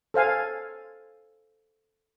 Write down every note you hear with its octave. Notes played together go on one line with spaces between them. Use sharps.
A4 C5 F5 G#5